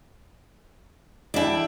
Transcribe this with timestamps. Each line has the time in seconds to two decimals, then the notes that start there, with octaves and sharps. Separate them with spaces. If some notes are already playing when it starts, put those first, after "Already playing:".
1.34 D4 E4 D5 E5 G5